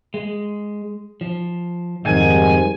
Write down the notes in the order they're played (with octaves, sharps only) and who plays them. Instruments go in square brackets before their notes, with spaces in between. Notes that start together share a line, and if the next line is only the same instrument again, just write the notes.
[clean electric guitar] G#3
F3
[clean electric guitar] C2 F2 [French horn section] G#2 D#3 G3 [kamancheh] G#5